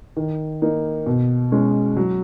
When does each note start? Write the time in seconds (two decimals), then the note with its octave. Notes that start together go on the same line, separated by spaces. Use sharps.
0.16 D#3
0.62 A#3 D#4
1.06 B2
1.52 G#3 C#4
1.97 F#3